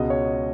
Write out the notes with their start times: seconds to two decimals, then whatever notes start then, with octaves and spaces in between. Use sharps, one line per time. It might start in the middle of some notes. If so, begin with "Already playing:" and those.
Already playing: C#2 B2 G#3 D#5
0.10 C#5